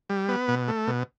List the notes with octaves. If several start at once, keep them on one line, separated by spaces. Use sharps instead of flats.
G3
B3
B2
A3
B2